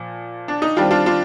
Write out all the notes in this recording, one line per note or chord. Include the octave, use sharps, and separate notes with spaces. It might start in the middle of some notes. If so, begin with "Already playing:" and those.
Already playing: A#2 F3
D4
D#4
D#3 G3 C4 D4 F4
D4 F4
D4 F4